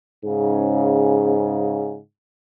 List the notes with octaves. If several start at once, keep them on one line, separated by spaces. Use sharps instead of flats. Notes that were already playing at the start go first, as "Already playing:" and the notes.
G#2 C#3